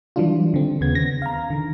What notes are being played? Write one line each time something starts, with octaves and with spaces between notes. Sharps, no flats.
E3 F#3 G3 D4 F4
D3 C4
D#2 C#3 B3 G#6
A#6
F5 A#5
D3 D#3